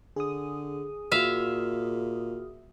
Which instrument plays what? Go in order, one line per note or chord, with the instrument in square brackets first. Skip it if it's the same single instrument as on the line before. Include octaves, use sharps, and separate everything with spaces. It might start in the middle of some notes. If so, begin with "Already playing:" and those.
[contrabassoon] D3 [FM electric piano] G#4 D#6
[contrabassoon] A#2 [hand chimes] F#4 F6 [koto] E5 F5